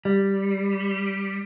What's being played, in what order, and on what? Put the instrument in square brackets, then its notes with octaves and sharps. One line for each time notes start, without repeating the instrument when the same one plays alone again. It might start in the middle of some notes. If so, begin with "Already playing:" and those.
[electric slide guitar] G3